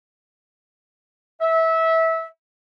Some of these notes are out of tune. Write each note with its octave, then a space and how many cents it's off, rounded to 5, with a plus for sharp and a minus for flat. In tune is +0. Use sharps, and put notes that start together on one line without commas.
E5 -20